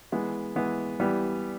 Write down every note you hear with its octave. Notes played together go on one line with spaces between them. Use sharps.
E3 G#3 B3
E3 G#3 B3
E3 G3 B3